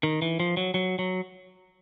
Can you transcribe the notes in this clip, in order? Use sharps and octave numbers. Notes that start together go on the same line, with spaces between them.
D#3
E3
F3
F#3
F#3
F#3